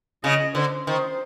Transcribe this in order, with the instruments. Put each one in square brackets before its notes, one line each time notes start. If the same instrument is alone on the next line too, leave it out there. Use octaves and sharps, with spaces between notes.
[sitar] C#3 [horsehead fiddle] D#5
[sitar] D3 [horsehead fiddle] C5
[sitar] D#3 [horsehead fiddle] C5